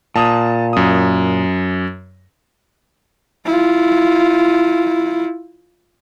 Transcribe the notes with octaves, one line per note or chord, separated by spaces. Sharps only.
A#2 A5 D#6
F#2 D#6
E4 F4